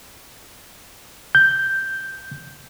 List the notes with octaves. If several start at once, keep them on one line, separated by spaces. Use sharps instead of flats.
G6